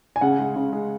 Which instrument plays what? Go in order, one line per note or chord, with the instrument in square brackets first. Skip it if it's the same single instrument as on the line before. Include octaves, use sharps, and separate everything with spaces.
[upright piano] G#5
C#3 F#5
G#3
C#3
G#3